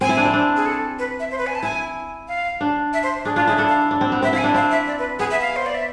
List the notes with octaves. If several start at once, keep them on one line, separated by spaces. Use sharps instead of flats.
C4 G#5
E4
D4
C4
D4
G#4
A4
B4
E5
C5
B4
G#5
A5
E4 G#5
F5
D4
E5
C5
D4 G#4
D4 F4
E4 G#4
D4 A4
F5
D4
C4
B3
C4 E5
E4 F5
G#5
D4
C4 F5
E5
D5
B4
B3 G#4
E5
F5
C5
D5
E5